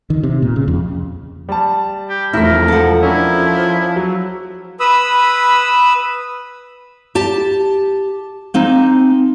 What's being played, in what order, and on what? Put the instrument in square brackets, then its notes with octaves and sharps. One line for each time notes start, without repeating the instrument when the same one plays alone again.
[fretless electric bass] D#3
C3
A#2
C#3
F2
[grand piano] G3 A5
[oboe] G4
[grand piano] E1 B6 [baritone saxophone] F2 [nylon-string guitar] A3 E4 [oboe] A#4
[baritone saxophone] F3 [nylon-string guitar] A4 F#5
[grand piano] C#4 D4 A#4 [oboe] E4
[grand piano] F#3
[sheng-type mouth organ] B4 B5 D#6 E6
[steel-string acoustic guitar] G4 A5
A#3 C4 D#4